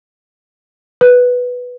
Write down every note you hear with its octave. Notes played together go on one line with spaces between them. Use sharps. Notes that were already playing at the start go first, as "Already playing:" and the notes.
B4